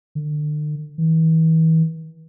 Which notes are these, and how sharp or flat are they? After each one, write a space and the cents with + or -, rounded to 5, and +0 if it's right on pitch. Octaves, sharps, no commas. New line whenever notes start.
D3 +40
E3 -40